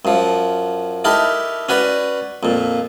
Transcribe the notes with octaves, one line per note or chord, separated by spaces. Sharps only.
F#2 F3
D#4 E4 G4 A4 A#4
C#4 F#4 B4 D5
F2 A#2